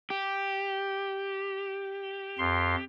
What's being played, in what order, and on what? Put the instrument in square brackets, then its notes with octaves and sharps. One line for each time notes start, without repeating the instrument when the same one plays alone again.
[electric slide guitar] G4
[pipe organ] F2 C6